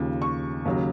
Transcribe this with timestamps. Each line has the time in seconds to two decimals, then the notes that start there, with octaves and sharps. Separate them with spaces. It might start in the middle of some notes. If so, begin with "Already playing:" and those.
Already playing: D#2 C#3 F3
0.22 C#6
0.65 D#2 C#3 F#3